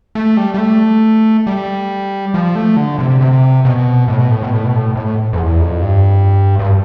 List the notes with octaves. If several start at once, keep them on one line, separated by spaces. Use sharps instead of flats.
A3
G3
G3
A3
G3
F3
A3
D3
C3
C3
B2
A2
B2
A2
B2
A2
B2
A2
A2
F2
E2
F2
G2
G2